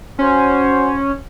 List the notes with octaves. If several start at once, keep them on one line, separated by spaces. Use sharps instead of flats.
C#4 F#4 C5